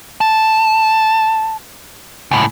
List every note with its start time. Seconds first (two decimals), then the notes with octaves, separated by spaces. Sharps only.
0.21 A5
2.31 C#2 A2